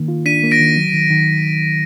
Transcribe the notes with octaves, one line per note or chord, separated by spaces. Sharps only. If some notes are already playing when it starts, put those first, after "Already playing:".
Already playing: D#3 A#3
F4
D4 B6 D#7
A#3
A#6 D7
D#3
F#3
D#3
D#3